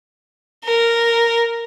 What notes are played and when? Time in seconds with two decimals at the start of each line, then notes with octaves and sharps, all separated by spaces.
0.65 A#4